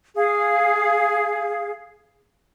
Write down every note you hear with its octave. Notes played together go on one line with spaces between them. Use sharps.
G#4 F5